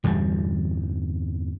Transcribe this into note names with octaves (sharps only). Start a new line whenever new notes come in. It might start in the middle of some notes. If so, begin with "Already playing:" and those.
G1 E2 G3